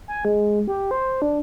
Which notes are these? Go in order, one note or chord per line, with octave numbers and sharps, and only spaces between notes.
G#5
G#3
G4
C5
D4